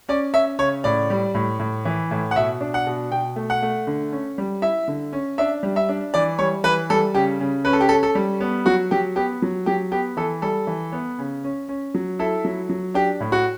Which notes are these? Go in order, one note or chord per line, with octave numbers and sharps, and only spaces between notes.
C#4 D5
C#4 E5
C#3 C#5
A2 D5
G3
A2
A2
E3
A2
F#5
B2 E5
D4
F#5
B2
B2 G5
A3
F#5
A3
D3
C#4
G3
E4 E5
D3
C#4
D4 E5
G3
E5
D4
E3 D5
G3 C#5
E3 B4
G3 A4
C#3 G4
C#3
C#4 B4
A4
G4
C#4 A4
A4
G3
B3
F#3 F#4
F#3 G4
B3 G4
F#3
F#3 G4
B3 G4
E3 A4
G3 A4
E3
B3
C#3
C#4
C#4
F#3
E4 A4
F#3
F#3
D4 G4
A2
F#4